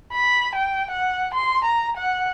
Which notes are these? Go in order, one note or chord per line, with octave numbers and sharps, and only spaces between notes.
B5
G5
F#5
C6
A#5
F#5